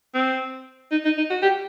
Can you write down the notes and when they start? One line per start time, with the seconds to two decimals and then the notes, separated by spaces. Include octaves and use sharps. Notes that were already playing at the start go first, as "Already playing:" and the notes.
0.15 C4
0.91 D#4
1.05 D#4
1.18 D#4
1.30 F#4
1.42 G4